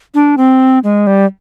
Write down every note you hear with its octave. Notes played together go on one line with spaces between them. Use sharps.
D4
C4
G#3
G3